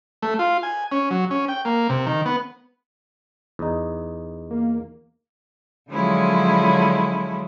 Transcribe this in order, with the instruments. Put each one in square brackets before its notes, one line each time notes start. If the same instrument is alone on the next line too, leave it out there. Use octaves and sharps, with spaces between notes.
[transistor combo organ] A3
F4
G#5
C#4
F#3
C#4
G5
A#3
C3
D#3
B3
[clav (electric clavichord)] E2 D#4
[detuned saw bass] A#3
[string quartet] D3 F3 F#3 G#3 C#4 E4